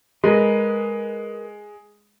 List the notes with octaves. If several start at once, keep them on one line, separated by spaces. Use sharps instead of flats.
G#3 A#4 B4 D#5